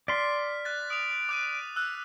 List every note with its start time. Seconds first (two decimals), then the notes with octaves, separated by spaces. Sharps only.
0.08 D5 C6 F6 B6
0.65 F#6 A6
0.90 D#6 D7 F7
1.29 D6 F#6 D#7
1.76 E6 F#6